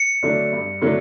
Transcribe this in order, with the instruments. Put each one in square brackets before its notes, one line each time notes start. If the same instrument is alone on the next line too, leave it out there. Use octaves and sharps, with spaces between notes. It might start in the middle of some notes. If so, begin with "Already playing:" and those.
Already playing: [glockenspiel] C#7
[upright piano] D3 F#3 A3 D4
G2
D3 F#3 A3 D4